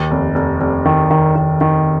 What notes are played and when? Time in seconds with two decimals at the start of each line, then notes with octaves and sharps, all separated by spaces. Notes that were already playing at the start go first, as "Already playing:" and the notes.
Already playing: D#2
0.11 F1
0.35 F1
0.61 F1
0.85 D#3
1.11 D#3
1.36 D#3
1.61 D#3